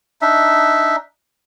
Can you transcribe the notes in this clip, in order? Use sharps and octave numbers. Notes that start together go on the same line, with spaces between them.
D4 D#4 E5